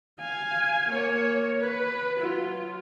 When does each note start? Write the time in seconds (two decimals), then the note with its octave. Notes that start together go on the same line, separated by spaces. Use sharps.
0.20 F5 G#5
0.89 A#3 C#5
1.60 B4
2.19 F#3 F4